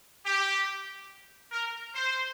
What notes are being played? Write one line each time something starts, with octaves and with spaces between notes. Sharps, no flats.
G4
A#4
C5